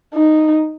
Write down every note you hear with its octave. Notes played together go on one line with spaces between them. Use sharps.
D#4